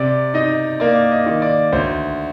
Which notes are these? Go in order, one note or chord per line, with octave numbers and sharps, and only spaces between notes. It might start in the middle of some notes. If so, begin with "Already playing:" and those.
Already playing: C3 D5
D#4 D#5
A#3 D5
D#5
D#3
D5
D2 C5